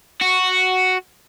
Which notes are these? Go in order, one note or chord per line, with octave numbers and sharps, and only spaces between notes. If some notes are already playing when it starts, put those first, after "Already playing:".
F#4